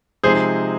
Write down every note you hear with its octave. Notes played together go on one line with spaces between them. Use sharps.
C3 F3 G#3 C4 D#4 G#4 C5